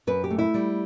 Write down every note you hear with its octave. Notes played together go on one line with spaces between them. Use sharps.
F#2 B4
G4
A3
E4
G3